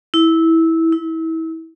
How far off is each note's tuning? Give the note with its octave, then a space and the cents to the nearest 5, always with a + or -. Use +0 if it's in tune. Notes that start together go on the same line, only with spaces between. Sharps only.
E4 -15
E4 -30